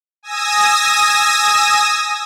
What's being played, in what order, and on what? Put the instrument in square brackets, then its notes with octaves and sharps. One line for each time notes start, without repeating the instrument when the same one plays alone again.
[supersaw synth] G#5 D#6 E6 A#6